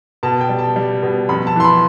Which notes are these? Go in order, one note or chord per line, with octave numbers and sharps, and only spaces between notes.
B2 A5
G5
G3
A5
G3
B2
F2 B5
A5
E3 C6
B5